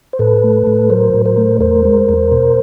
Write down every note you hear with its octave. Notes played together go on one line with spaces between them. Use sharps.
C5
A2 A4 B4
A3
A2
F#3 A#4 C5
A2
A#4 C5
A3
E2 A#4 C5
G#3
E2
B2